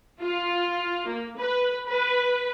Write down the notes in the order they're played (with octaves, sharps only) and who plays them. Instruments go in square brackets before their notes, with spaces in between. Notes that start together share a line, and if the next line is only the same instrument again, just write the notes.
[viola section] F4
A#3
B4
B4